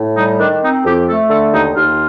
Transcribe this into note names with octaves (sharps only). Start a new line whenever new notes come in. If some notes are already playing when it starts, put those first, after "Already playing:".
Already playing: A2
G3 D#4
D#3 D4
C4 D#4
F2 G4
A3 A4
D3 A4
D#2 D#4
D#2 F4